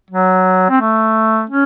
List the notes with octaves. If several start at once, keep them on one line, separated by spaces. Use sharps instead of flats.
F#3
C4
A3
C#4